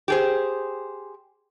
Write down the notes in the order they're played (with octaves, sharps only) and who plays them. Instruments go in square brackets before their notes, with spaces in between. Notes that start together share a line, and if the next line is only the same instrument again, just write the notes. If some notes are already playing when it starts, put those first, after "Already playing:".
[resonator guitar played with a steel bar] G4 G#4 C5